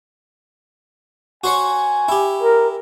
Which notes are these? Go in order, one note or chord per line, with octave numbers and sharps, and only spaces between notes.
F#4 C5 C#5 G#5
E4 G4
A#4